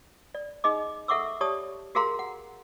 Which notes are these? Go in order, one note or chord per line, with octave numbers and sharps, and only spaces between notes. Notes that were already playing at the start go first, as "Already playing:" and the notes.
D5
D#4 G#4 D#5 D6
A4 E5 F#5 C#6 D6 E6
G4 C#5 D5 A5 D#6
F#4 G#4 A#4 F5 A#5 C6
F#5